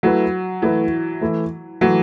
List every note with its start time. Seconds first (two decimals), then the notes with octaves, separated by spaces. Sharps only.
0.03 F#3 A3 E4 B4
0.62 E3 A3 E4 B4
1.21 E3 A3 E4
1.81 E3 F#3 A3 E4